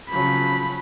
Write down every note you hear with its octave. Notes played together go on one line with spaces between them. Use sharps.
C#3 F3 F#3 B5